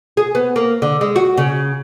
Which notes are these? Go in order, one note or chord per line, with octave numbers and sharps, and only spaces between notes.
G#4
B3
A#3
D3
G#3
F#4
C#3